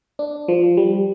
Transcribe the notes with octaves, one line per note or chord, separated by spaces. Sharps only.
D4
F3
G3